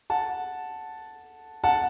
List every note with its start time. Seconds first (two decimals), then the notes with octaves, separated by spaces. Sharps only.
0.10 F#5 A5
1.64 F#5 A5